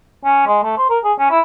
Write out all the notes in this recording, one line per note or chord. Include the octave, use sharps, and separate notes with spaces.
C#4
G#3
A3
C5
A#4
G#4
C#4
E4